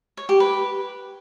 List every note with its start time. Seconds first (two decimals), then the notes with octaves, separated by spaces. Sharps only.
0.17 C#5
0.29 G4
0.40 B4